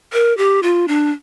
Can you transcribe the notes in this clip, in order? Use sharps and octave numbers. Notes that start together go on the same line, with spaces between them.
A#4
G4
F4
D4